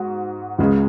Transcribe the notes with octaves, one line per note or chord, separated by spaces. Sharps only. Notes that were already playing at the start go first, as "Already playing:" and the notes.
Already playing: G#2 F#4
C#2 C#3 G#3